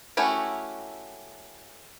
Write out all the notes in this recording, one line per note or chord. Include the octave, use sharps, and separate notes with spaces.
A3 C#4 E4 F#4 G4